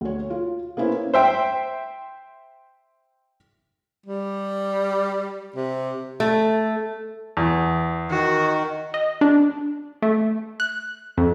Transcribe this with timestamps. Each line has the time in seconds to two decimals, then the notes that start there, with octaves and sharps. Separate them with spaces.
0.01 D2 C#5
0.30 F4
0.77 A#3 B3 C#4 E4 A#4 C5
1.14 C5 E5 G5
4.06 G3
5.56 C3
6.20 A3
7.37 E2
8.10 D#3 F#4
8.94 D#5
9.21 D4
10.02 A3
10.60 F#6
11.18 F2